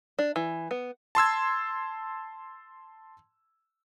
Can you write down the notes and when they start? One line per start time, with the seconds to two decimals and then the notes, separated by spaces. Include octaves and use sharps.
0.19 D4
0.36 E3
0.71 B3
1.15 A5 C6 E6 G#6